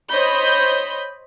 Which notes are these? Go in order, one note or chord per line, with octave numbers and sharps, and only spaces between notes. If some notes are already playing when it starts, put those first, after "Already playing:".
C5 C#5 D#5 B5 G6